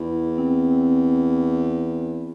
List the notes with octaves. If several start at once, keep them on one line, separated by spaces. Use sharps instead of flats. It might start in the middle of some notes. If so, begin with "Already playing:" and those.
Already playing: E2 E4
C4